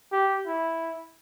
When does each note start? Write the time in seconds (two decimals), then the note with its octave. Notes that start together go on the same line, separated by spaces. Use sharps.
0.13 G4
0.46 E4